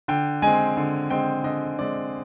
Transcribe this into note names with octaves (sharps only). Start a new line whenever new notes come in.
D3 G5
G#3 C4 G#5
D3
G#3 C4 G5
D3 D#5
G#3 C4 D5